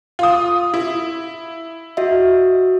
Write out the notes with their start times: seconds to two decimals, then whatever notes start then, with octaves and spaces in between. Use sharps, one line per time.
0.19 F4 D#6
0.74 E4
1.97 F#4 D#5 E5